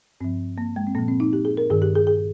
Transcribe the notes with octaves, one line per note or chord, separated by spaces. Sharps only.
G2 F3 C4
A#3
G#3
C4
A#2 F3 A#3
C4
D#4
G4
G#4
A#4
G2 D#3 G#4
G4
G#4
G#4